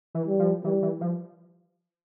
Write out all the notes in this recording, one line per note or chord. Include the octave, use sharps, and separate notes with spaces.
E3
G3
F3
E3 G3
E3
F3